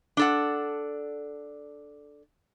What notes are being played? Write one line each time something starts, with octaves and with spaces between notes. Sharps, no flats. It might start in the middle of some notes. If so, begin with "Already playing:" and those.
D4 A4 F#5